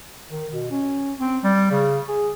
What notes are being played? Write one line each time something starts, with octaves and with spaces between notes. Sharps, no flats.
D#3
B2
C#4
C4
G3
C#3
G#4